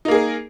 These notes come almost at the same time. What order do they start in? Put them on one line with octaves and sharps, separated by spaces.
D#4 A#3 G#4 A#4